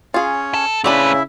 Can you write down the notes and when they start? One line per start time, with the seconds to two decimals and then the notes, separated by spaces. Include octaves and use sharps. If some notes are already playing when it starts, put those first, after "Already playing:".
0.14 C#4 F4 G#4 C#5
0.54 A4
0.84 C#3 A3 C4 D4 E4 B4 E5 B5